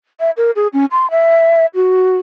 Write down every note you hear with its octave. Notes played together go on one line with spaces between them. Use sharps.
E5
A#4
G#4
C#4
C6
E5
F#4